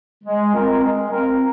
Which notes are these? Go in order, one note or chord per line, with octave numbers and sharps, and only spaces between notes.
G#3
C4 F4 A#4
G#3
C4 F4 A#4